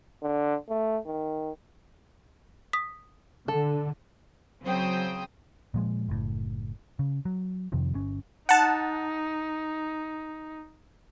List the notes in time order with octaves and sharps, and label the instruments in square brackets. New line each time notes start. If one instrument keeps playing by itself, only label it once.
[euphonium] D3
A3
D#3
[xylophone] D#6 B6
[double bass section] D3 [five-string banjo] A4
[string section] C#3 F#3 C4 C5 G5 D#6
[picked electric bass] A#2 F3 G#3
F#1 A2
C#3
F#3
F2 C3 D#3 F3
G1 C#4
[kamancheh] D#4 [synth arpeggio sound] F#5 A5